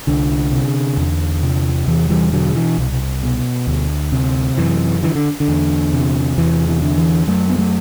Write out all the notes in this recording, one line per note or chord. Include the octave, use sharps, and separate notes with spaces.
C2 D3
C3
E2
C3
E2 E3
E3 G3
B2 D3 F#3
E3
C2
B2
D2
C3
F#2 E3
D3 E3
D3
D3
E2
C3
E2 E3
E3
D3
E3
F#2 F#3 A3
B3
F#3 A3